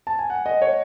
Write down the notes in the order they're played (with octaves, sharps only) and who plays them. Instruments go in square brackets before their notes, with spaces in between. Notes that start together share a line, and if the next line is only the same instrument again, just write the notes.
[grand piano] A5
G#5
F#5
D#5
C#5